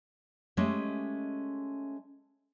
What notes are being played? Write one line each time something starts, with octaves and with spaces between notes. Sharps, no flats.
G#3 A3 C#4 G4 D#5 E5